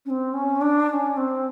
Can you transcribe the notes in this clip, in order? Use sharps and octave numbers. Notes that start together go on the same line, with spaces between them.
C#4
C4
C#4
D4
D4
C#4
C4